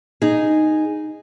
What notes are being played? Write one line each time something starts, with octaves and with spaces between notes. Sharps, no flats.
D#4 G#4